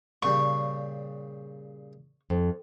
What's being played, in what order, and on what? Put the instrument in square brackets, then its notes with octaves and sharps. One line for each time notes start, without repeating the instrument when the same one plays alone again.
[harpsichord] A#2 C#3 G3 [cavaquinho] C#6
[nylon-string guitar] F2